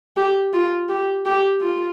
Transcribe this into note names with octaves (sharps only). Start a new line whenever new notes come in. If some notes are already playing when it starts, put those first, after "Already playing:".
G4
F4
G4
G4
F4